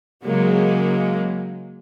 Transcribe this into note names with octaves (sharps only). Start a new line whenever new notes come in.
C#3 F#3 G#3 A#3